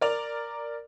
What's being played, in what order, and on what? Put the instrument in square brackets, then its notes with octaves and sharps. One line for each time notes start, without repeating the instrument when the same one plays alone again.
[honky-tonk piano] A#4 D5 F7